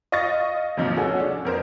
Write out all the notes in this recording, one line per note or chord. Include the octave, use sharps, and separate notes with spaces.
D#5 F5 C#6 D#6 A6 A#6
D#2 G#2 C3 F3 F#3 D#4
C#4 F#4 G#4 A4 F#5
D4
F2 A#4 C5